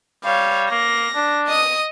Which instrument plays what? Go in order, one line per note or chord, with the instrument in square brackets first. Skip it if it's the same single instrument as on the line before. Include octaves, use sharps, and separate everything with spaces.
[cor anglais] G3 [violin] C#5 F5
[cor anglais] A#3 [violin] A#6
[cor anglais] D4
[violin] D#5 D#6